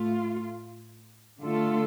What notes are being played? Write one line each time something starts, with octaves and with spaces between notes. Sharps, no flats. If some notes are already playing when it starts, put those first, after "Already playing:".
Already playing: A2 A3 F4
D3 A3 F4 A4